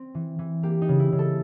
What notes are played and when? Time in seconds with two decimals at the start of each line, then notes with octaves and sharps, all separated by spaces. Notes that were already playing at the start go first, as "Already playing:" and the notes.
Already playing: C4
0.14 E3
0.39 E3
0.63 A#3 G4
0.81 D#4
0.88 C#3
0.99 E4
1.12 C#3
1.19 A4